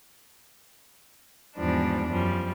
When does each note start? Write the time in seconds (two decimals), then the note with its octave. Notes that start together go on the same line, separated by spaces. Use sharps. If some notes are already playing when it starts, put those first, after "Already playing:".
1.56 E2 G#2 F3 G3 D4
2.11 F#2 F3 G3